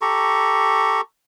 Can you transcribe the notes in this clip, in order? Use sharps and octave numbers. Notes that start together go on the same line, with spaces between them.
G4 A4 A#5 C#6